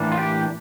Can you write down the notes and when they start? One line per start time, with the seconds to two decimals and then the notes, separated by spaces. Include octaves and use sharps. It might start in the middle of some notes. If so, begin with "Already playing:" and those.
Already playing: A2 E3 A#3 D4
0.12 F4
0.18 G4